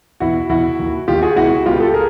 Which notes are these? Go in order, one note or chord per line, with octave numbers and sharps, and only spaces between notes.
E2 B2 E4 F#4
E2 B2 E4 F#4
D#2 D#3
D#2 D#3 F4 G4
F#4 G#4
C#2 B2 E4 F#4
C#2 B2 F4 G4
G4 A4
G#4 A#4